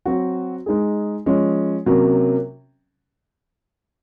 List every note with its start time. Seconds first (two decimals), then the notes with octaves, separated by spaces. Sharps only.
0.06 F#3 C4 F#4
0.66 G#3 D#4 G#4
1.26 F3 G#3 C#4
1.86 C3 F#3 A#3 C#4